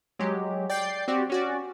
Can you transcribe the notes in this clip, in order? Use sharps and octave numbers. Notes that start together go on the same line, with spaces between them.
F#3 G#3 G4
D5 G5 G6 A6 C7
C4 F#4 G4 D5
C#4 F#4 D5